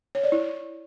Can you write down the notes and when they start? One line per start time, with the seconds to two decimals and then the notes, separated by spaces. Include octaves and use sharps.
0.15 C#5
0.23 D5
0.32 E4